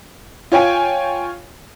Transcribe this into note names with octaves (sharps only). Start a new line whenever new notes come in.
F4 C#5 G5 G#5